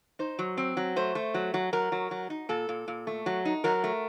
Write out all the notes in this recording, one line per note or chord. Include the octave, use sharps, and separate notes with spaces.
D#4 C5
F#3
C4
F#3
A3 C5
A3
F#3
F#3
F#3 A#4
F#3
F#3
D#4
A#2 A4
A#2
A#2
A3
F#3
D#4
F#3 A#4
A3